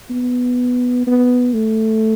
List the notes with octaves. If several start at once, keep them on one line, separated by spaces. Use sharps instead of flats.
B3
B3
A3